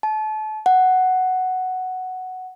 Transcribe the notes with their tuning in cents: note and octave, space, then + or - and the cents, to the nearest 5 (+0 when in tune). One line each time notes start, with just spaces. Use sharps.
A5 -30
F#5 +5